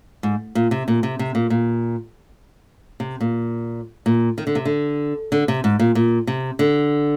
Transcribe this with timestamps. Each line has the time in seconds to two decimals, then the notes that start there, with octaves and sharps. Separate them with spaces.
0.23 G#2
0.55 A#2
0.71 C3
0.88 A#2
1.03 C3
1.19 C3
1.35 A#2
1.50 A#2
3.00 C3
3.21 A#2
4.06 A#2
4.38 D#3
4.47 D3
4.55 C3
4.65 D3
5.32 D3
5.48 C3
5.64 G#2
5.79 A#2
5.95 A#2
6.27 C3
6.59 D3